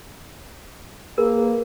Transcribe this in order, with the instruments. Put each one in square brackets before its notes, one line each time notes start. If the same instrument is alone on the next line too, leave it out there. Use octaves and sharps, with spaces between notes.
[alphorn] A#3 [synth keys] G#4 B4 [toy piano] A#4